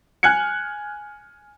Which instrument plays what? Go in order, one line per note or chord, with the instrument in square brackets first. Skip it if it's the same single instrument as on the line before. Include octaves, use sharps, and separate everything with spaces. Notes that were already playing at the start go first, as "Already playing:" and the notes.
[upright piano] G#5 F6 F#6 G#6 C#7